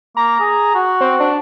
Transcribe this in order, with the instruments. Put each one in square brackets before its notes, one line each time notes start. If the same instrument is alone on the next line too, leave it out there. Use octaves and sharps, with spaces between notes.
[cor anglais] A#3 [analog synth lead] A#5
[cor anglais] G#4
F#4
[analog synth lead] C4
D4